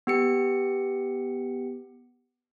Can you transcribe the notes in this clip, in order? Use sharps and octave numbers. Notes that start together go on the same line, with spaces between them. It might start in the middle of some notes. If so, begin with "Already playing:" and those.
B3 G4 C#7